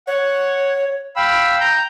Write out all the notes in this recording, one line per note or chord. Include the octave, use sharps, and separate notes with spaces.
C#5 F#5
F5 G5 B5 E6
A#5 G6